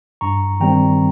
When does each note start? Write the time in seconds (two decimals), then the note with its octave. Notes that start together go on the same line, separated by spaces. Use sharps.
0.21 G2 A#5 C#6
0.60 D#3 G3 C4 G5 A#5